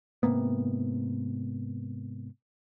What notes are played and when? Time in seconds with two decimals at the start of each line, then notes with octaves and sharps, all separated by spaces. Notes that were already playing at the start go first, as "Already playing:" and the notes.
0.23 G#2 C3 A#3 B3